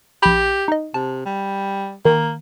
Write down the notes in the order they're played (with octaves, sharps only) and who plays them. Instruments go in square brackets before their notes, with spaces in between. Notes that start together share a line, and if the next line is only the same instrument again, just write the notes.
[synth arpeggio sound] A#1 B5 [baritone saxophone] G4
[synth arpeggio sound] D#4 D#5
[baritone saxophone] C3 [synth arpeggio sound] A5
[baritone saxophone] G3
[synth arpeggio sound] D#3 [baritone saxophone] A#3